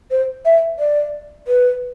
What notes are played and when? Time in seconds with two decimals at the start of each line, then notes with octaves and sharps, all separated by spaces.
0.11 C5
0.45 E5
0.79 D5
1.48 B4